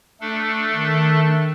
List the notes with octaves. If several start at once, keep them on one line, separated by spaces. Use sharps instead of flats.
A3 D4 A4
D#3